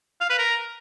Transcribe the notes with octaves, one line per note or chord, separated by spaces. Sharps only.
F5
B4
A#4